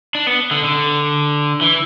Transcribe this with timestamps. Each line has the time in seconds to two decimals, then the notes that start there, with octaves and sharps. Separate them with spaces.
0.15 D4
0.27 B3
0.51 D3
0.64 D3
1.61 E3